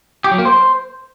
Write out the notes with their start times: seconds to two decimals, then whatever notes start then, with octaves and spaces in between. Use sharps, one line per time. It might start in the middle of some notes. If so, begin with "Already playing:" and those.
0.24 G4
0.31 F#3
0.38 A#3
0.45 C5